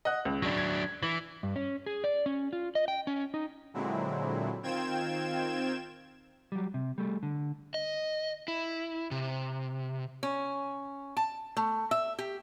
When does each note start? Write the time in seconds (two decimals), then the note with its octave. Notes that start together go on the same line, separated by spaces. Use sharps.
0.05 D#5 F#5 F#6
0.25 C#2
0.42 F#3 D4
0.57 G#6
1.03 E3 F#7
1.43 G2
1.56 C#4
1.86 G#4
2.04 D5
2.26 C#4
2.53 F4
2.75 D#5
2.88 G5
3.07 C#4
3.34 D#4
3.74 A#2 D3 F#3 G#3 C4 E4
4.63 D#3 C4 F4 G5 G#6 E7
6.52 F#3 G3
6.74 C3
6.98 G3 A3
7.23 D3
7.74 D#5
8.48 E4
9.11 C3
10.23 C#4
11.17 A5
11.57 A3
11.91 E5
12.19 G4